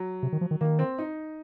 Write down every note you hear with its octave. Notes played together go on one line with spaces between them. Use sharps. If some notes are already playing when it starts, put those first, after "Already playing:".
Already playing: F#3
C3
D#3
F3
D#3
D#3 A#3
C4
D#4